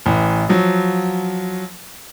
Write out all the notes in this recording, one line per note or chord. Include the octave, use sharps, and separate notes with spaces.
A1 E3
F3 F#3